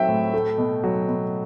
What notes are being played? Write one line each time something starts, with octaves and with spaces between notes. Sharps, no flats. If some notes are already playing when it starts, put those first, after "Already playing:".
Already playing: F#3 A3 C4 E5 G5
A2
A3
B2
F#3
B2